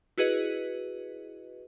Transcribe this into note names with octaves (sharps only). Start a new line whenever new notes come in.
E4 F#4 G#4 B4 D#5